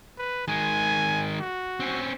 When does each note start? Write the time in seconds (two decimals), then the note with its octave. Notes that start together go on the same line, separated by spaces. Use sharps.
0.18 B4
0.48 D#3 G#3 G#5
1.40 F#4
1.80 C4 C#4